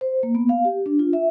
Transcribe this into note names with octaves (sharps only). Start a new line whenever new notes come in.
C5
A#3
B3
F5
G4
D4
F4
E5